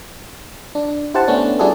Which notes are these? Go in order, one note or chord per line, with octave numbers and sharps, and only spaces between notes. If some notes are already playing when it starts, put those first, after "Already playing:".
D4
E4 G4 C5 F#5 A5
A3 B3 C#4 D4
G3 D4 E4 F#4 G#4 A4